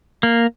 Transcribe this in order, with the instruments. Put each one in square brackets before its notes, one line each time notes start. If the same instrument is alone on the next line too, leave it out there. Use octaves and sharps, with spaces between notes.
[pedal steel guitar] A#3